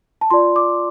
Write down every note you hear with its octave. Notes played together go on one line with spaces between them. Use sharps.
A5
F4 D5 C6
D6